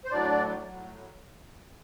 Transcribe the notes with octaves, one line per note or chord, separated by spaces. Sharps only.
C5
A2 F#3 D4 D5
A2 F#3